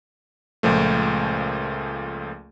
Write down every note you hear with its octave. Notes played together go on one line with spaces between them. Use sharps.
C#2 A#2 F3 A3